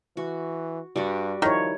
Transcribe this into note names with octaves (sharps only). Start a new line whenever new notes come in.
E3 F#4
G2 G3 F#4
D#3 F3 E4 C#5